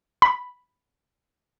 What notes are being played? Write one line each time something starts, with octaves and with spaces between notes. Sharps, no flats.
B5